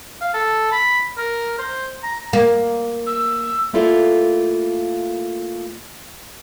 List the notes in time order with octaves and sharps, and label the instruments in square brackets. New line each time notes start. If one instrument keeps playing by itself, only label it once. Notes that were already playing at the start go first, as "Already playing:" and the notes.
[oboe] F5
A4
B5
A#4
C5
A#5
[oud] A#3
[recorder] E6
[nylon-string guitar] A3 A#3 E4 F4 A4 D5